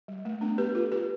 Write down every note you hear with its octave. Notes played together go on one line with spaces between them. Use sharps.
G3
A3
B3 D4
G4 B4
F4 A4
G4 B4